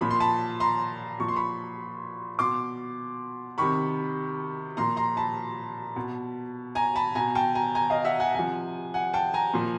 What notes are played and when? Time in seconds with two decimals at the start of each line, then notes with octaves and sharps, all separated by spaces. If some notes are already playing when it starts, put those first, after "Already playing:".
0.01 A#2 F3 B5
0.11 C6
0.20 A5 B5
0.60 A#5 C6
1.20 A#2 F3 C#6
1.28 C6
1.36 B5 C#6
2.39 B2 C6 D6
3.58 C3 D#3 B5 C#6
4.77 A#2 F3 A#5 C6
4.97 A#5 C6
5.17 A5 B5
5.96 B2
6.75 G#5 A#5
6.96 A5 B5
7.15 B2 G#5 A#5
7.35 G5 A5
7.55 G#5 A#5
7.75 G#5 A#5
7.90 D#5 F5
8.05 E5 F#5
8.20 F#5 G#5
8.34 C3 F3 F#5 G#5
8.94 F#5 G#5
9.13 G5 A5
9.34 G#5 A#5
9.54 A#2 F3